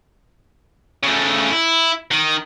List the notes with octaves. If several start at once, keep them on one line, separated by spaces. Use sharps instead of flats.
C#3 A3
E4
D#3